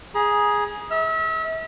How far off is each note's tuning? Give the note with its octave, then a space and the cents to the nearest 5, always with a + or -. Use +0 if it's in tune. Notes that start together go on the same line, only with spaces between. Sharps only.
G#4 +0 A#5 +40
E5 -35 E6 +45